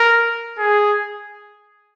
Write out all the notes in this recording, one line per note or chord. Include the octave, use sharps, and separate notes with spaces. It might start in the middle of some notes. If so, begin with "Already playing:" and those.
Already playing: A#4
G#4